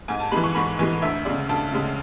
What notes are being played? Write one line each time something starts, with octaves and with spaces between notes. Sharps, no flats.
G#2 G#5
A5
E3 G#3 B5
C#6
G#2 B5
E3 G#3 G#5
D2 E5
C#3 G#3 D5
D2 A5
C#3 G#3